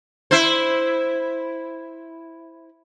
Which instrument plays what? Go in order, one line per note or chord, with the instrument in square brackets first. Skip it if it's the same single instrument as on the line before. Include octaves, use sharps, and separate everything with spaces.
[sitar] E4 C5